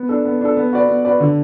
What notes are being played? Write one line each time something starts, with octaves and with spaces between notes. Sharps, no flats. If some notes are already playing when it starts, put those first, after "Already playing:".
Already playing: B3
D4 A4
B3
D4 A4
B3
F#4 B4 D5
B3
F#4 B4 D5
D3